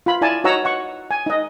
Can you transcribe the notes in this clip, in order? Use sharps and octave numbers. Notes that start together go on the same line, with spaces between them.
F4 B5
E4 D5 G#5 A5
D#4 F#4 C#5 F#5 A#5 E6
F#5 C#6
G#5
D#4 D#5